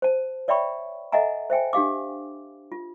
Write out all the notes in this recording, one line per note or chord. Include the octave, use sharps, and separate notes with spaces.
C5 A5
C#5 D5 E5 G5 B5 C#6
A4 D#5 E5 F#5 G#5 A#5
C5 E5 G5 G#5
D4 G4 F5 D6
F4